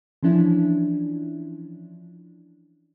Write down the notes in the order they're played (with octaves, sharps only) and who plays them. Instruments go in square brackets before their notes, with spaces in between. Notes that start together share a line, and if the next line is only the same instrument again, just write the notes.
[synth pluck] E3 F3 C#4 D4 E4